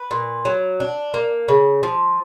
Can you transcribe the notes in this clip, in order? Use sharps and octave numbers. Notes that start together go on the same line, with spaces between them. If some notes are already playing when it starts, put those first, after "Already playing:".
Already playing: B4
A#2
F#3
D4
A#3
C#3
F3